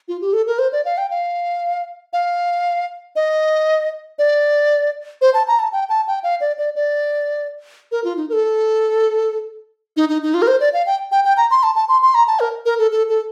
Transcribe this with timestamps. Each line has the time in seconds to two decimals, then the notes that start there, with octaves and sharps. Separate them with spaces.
0.08 F4
0.21 G4
0.33 A4
0.47 A#4
0.59 C5
0.72 D5
0.85 F5
0.98 G5
1.11 F5
2.13 F5
3.16 D#5
4.19 D5
5.21 C5
5.34 A5
5.48 A#5
5.59 A5
5.72 G5
5.89 A5
6.07 G5
6.23 F5
6.41 D5
6.58 D5
6.75 D5
7.92 A#4
8.04 F4
8.17 D#4
8.29 A#4
8.33 A4
9.97 D#4
10.09 D#4
10.22 D#4
10.34 F4
10.42 A#4
10.48 C5
10.60 D5
10.73 F5
10.86 G5
11.12 G5
11.25 G5
11.37 A#5
11.51 C6
11.63 A5
11.76 A5
11.89 C6
12.02 C6
12.15 A#5
12.27 A5
12.40 A#4
12.65 A#4
12.78 A4
12.91 A4
13.09 A4